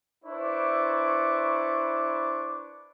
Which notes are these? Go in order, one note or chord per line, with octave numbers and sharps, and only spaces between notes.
D4 E4 B4 C5 C#6 D6